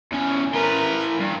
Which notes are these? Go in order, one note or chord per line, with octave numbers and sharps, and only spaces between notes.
E2 C#4
E3 A#4 B4 C6
G2